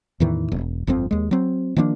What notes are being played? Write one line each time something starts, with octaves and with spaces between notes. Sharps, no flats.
E2 A2 D#3 E3
E1
G1 F2 F3 C4
D#2 G#3
F#3 C4
D#3 F3 A#3 D4